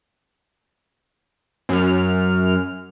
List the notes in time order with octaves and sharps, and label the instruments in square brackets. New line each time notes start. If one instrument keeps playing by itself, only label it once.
[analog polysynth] F#2 F6